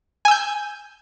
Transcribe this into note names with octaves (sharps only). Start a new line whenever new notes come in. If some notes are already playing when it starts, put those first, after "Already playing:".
G#5 E6 G6